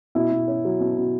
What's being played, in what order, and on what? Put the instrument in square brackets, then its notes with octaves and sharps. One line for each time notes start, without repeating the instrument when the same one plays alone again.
[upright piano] B2 [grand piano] E4
[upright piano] B2
C#4
F#3
B2
B2